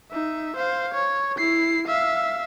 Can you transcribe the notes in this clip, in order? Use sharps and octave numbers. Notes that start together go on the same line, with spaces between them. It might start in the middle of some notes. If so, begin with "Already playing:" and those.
D#4 E5
C5 F5
C#5
E4 C7
E5 F5